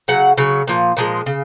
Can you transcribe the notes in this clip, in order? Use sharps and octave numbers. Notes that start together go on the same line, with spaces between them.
C#3 F#3 F#5
C#3 F#3
A#2 F3
A#2 F3 G#3
C#3